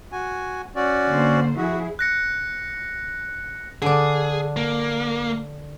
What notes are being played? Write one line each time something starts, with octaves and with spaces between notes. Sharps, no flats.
F#4 G#5
C#4 F#4 D5
D3 A#3 C5
F2 E4 F#4 G#4
F#6 A#6 C#7
D3 D4 G#4
A#3